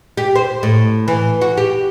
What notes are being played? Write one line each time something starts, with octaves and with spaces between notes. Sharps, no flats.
G4
C5
A2
E3
F#4
G4